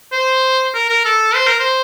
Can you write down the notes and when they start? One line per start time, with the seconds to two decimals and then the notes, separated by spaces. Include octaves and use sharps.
0.12 C5
0.74 A#4
0.89 A#4
1.05 A4
1.35 C5
1.47 A#4
1.60 C5